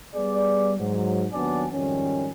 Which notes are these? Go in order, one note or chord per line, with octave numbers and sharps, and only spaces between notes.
G3 B3 G#4 D5
G#2 F#3
D#2 F#3 B3 D4 D5 G#5
G#1 F2 D#3 G3 C#4